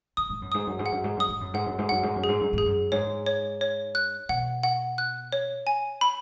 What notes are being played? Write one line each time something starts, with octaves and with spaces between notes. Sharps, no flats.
F#2 D#6
G#2
F#2
G#2 D#6
F#2
G#2
F#5
F#2
G#2
F#2 D#6
G#2
F#2
G#2 F#5
F#2
G#2
F#2 F#5
G#2
F#2
G#4
G#2
F#2
G#2 G#4
F#2
G#2 C#5
C#5
C#5
F#6
B2 F#5
F#5
F#6
C#5
G#5
B5